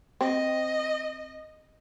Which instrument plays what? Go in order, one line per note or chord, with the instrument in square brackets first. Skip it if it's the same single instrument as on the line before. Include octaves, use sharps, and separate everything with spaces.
[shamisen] C4 [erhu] D#5